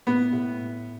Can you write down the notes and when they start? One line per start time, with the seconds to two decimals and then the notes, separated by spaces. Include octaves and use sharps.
0.07 A2 B3
0.33 A2